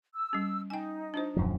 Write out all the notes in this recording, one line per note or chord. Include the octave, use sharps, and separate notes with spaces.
E6
G3 C#4
D#4 G5 G#5
D4 F4 C5
D#1 F#2 F3